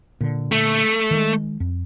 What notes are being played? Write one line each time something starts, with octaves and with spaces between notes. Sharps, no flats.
A#2 D3
A3
D#3 G#3
F2